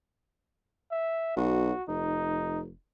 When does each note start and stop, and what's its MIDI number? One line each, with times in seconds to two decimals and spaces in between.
0.92 1.32 76
1.37 1.72 35
1.37 1.83 66
1.88 2.73 29
1.88 2.60 63